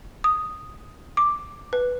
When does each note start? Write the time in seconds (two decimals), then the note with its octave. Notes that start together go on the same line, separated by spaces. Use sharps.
0.24 D#6
1.17 D6
1.73 B4